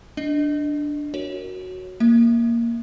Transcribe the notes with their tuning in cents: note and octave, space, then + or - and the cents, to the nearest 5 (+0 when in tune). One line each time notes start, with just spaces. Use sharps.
D4 +0 D#5 +0
F#4 +0 A#4 +0 C#5 +0
A#3 +0 E5 -5